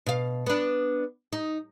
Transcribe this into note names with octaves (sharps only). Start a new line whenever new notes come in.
B2 F5
B3 D4
D#4